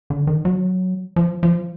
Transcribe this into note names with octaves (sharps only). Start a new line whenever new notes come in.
D3
D#3
F#3
F3
F3